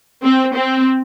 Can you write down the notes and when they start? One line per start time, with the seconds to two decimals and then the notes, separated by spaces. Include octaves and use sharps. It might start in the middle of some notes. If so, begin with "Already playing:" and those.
0.23 C4
0.54 C4